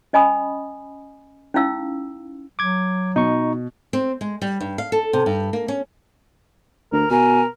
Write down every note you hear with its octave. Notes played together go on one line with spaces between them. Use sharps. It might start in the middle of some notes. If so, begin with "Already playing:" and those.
C#4 D#5 G#5 B5 D#6
C#4 D#4 E4 F5 E6
F#3 D6 G#6
B2 D#4 C#6
C4
G#3
G3
G2
F5
A4
C3
G2
A#3
C#4
D2 A#4
B2 A#4 G#5